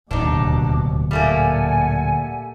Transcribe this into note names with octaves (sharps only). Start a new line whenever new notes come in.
D1 D#2 B2 D4 D#4 D6
A#2 G3 A3 A#3 F#5 G#5